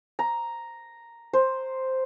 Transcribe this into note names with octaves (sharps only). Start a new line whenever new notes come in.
A#5
C5